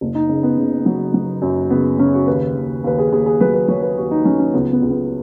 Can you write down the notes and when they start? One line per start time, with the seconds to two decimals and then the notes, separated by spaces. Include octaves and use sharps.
0.01 F#1
0.15 D#4
0.29 C#3
0.43 B3
0.58 C#3
0.86 F#3
1.14 F#3
1.42 F#2
1.70 C#3 B3
1.99 C#3 C#4
2.14 F#4
2.27 D#2 B4
2.55 D#2
2.84 D#2 B4
2.99 G#4
3.12 D#2 G#4
3.26 G#4
3.40 F#3 B4
3.54 B4
3.68 F#3 C#5
3.82 B4
3.96 D#2 F#4
4.11 D#4
4.25 F#3 C#4
4.39 C#4
4.54 C#2 B3
4.73 B3
4.82 C#2
4.91 B3